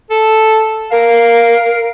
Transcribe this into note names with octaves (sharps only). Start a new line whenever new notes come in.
A4
A#4 F5